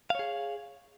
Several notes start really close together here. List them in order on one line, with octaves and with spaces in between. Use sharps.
F5 C#5 G#4